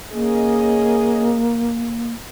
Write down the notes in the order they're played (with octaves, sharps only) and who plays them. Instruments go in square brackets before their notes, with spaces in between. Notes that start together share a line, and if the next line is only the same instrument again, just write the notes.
[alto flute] A#3 [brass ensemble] C#4 G#4 D#5